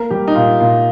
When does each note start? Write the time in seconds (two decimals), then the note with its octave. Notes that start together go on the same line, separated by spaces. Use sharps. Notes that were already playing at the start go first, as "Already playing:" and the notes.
Already playing: A#3 A#4
0.10 G3 G4
0.28 D#4
0.35 A#2 F4
0.60 A#2 F4